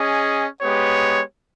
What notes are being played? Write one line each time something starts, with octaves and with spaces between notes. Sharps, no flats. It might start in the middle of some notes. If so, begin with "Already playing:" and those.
Already playing: C#4 G#4 D#5
G#3 B3 G4 C#5